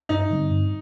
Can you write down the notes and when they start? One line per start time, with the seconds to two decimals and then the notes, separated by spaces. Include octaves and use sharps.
0.09 G2 D#4
0.31 D3 G3 C4
0.51 G2